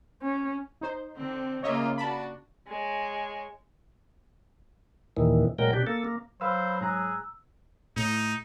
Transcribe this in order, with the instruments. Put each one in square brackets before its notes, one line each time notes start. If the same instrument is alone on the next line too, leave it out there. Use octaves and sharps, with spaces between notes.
[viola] C#4
[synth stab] D#4 C5
[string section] D3 C4
[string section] C#3 A#3 F4 [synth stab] C#5 D#5 E5
[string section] D4 F#4 [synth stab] A5 B5
[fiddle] G#3 C#5
[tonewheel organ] D#2 A#2 D#3 E3
A#2 F#3 G#3 A#4 G5
B2 D4 G4
A#3 A4
A#3
[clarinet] F#3 [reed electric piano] B4 F5 E6 [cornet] C5 [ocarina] B5
[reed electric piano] G#2 A#5 F#6 [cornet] G#4 [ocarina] E6
[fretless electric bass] A2 [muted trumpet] D#4